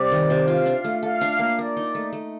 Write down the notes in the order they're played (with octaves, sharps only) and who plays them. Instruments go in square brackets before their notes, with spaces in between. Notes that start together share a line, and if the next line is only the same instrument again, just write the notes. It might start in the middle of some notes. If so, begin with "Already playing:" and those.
Already playing: [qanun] C3 G3 [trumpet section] D5
[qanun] D#3
C3
[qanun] F4 [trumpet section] F5
[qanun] D4
A3
[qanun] A4 [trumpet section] F5
[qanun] D4
A#3
[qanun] A#4 [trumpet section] D5
[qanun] D#4
A3
A3